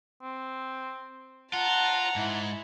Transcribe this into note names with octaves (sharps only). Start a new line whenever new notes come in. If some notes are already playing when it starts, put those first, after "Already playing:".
C4
F4 F#5 A5 A#5
G#2 E4